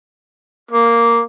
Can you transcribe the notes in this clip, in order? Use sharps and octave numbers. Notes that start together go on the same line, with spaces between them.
A#3